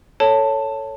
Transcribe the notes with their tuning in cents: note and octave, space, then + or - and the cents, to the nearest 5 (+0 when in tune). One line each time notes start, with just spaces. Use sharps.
A4 +10 C#5 +0 A5 +10